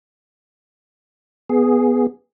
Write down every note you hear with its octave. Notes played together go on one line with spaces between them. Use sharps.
B3 G#4